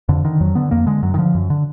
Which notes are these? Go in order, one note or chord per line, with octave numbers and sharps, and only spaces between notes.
F2 D3
D3 D#3
F2 F#3
D3 B3
F2 A#3
D3 G#3
F#2 F#3
D#3
D3 F3
F#2
D3